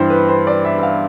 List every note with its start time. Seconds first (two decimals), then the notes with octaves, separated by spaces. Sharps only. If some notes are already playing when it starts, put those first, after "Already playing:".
Already playing: G2 E3 G3 C5
0.10 B4
0.28 C5
0.47 D5
0.65 E5
0.78 E5
0.83 F5